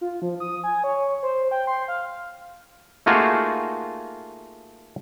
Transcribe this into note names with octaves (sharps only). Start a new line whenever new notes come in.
F4
F3
D#6
G#5
C#5
C5
G5
C6
F5
A3 A#3 D#4 F4 F#4 G#4